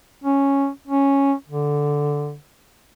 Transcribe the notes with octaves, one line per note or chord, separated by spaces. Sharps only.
C#4
C#4
D3